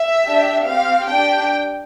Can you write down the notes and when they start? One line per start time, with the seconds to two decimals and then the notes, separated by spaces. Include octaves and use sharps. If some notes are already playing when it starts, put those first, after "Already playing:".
Already playing: E5
0.24 D4 G4
0.67 C4 G4 F5
1.09 D4 G4 G5